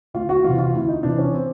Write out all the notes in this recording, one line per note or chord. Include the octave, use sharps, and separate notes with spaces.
D2 F4
F#4
C3 E3 F4
F4
D2 E4
D#4
C3 E3 D4
C#4
C4